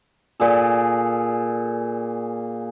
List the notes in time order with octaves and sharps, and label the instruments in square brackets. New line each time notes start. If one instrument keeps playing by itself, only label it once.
[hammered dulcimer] A#2 G#4 A4